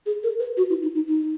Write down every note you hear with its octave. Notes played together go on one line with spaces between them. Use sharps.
G#4
A#4
B4
F#4
E4
D#4
D#4
D#4